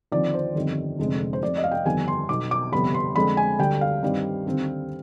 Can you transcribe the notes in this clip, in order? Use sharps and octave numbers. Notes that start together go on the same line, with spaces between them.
D#2 D3 F3 C4 D5
C5
G1 F2 D#3 G3 C4
F1 F2 D3 G#3 C4
C5
F1 F2 C3 D5
D#5
F5
G5
G1 F2 D#3 G3 B3 G#5
C6
B1 B2 B3 D6
D6
G1 F2 C3 G3 B3 B5
C6
F2 D3 G#3 C4 B5
G#5
D2 D3 G3 G5
F5
G2 D#3 G3 C4
D#2 D3 G3 C4